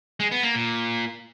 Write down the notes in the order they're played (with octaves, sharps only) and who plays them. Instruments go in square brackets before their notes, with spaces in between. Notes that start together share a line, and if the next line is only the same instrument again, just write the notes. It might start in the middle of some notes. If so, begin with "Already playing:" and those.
[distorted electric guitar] G#3
B3
A#3
A#2